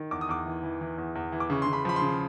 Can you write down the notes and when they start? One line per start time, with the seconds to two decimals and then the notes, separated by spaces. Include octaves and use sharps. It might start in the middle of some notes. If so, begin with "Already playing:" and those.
Already playing: D#3
0.11 E2 D6
0.21 D#6
0.29 E2 D6
0.46 E3
0.63 E3
0.81 E3
0.98 E2
1.15 E2
1.32 E3
1.40 D6
1.50 C#3 C#6
1.62 C#3 C6
1.73 B5
1.85 F3 B5
1.96 C6
2.02 C#3